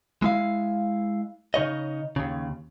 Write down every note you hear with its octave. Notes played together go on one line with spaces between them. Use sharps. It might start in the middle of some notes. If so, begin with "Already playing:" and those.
G#3 E4 F5
C#3 D#4 C#5 D#5
D#2 C#3